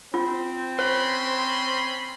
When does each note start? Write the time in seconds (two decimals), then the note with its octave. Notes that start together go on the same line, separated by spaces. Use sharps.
0.14 C4 F4
0.79 C#4 C5 B5 C6